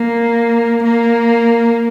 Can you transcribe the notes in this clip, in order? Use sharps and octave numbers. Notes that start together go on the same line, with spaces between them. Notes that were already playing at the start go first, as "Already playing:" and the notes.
Already playing: A#3
A#3